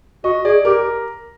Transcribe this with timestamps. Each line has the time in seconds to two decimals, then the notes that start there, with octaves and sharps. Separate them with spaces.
0.24 F#4 D#5
0.45 G#4 D5
0.65 G4 A#4